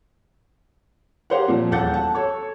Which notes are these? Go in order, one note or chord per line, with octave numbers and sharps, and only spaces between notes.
G4 G#4 A#4 C5 F5 F#5
A#2 F3
D#1 E2 A4 F#5 G6 A6
F#5 A5
A4 C#5 C#6